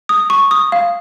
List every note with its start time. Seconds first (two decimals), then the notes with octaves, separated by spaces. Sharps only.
0.09 D#6
0.30 C#6
0.51 D#6
0.72 F5